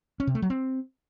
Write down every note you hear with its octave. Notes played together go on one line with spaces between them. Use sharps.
C#4
C3
A3
F#3
C4